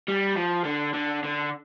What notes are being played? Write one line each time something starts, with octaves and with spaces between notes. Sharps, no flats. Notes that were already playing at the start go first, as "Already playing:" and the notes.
G3
F3
D3
D3
D3